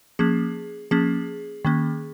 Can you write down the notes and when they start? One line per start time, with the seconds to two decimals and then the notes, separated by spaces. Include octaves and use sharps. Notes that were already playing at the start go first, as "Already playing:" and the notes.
0.19 F3 A#3 C#4 G#4
0.91 F3 A#3 C#4 G#4
1.65 D#3 A#3 C#4